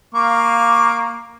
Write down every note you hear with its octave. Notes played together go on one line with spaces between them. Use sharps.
A#3 F5 C#6 D6